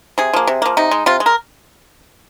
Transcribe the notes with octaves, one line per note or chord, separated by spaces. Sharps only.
C3 G#4
F3 A#3
C3
F3 A#3
C3 D#4
G#3
C3 F4
G#3
A#4